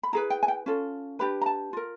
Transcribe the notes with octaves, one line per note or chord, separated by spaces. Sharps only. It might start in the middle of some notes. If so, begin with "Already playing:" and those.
B5
E4 G#4 B4 A#5
G5
G#5
G5
C#4 F4 A4
D4 G4 B4 B5
A#5
A5
F4 A#4